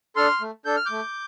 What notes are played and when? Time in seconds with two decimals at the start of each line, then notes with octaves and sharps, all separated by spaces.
0.16 D4 A4 C6 F6
0.41 A3
0.65 D4 A4 G6
0.76 F6
0.86 A3 D6 G6